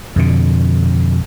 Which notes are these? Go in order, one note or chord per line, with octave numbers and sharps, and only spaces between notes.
F2 B2 D3